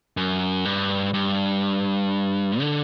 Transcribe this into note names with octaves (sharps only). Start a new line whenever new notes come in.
F#2
G2
G2
D3